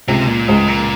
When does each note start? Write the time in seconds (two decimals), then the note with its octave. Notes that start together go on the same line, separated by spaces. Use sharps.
0.08 C#2 C3
0.27 A#2
0.48 C#2 G#2
0.68 A#2